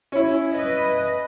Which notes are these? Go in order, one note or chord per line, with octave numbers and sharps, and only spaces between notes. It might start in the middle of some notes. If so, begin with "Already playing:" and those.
C#4 E4
B4 D#5